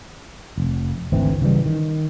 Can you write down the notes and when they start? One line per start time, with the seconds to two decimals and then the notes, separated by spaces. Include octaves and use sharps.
0.58 F1
1.12 G#1 D2 E3 C4
1.42 C#3 E3 G3
1.66 D#3